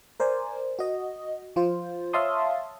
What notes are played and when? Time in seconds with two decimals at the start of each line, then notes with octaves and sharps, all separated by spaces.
0.20 A#4 C5 D5 G#5
0.79 F#4 D#5
1.56 F3 F4 C5
2.13 C#5 E5 F5 A5 C6 D#6